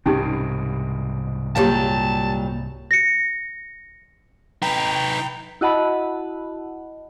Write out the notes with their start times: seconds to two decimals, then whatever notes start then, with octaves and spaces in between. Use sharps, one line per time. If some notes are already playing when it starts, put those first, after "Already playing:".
0.06 C2 G#2 B2 C#4 D#4 G4
1.56 A#2 F#3 G3 G4 C#5 F5 A5
2.91 A#6 C#7
4.62 D#4 B4 G5 A#5 F7
5.61 E4 F#4 D#5 F#5 A5 B5